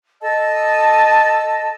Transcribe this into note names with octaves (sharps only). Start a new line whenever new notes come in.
A4 D#5 A5 E6